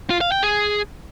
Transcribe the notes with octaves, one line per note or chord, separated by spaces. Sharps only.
F4
F5
G5
G#4